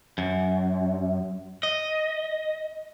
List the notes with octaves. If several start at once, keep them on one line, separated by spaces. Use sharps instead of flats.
F#2
D#5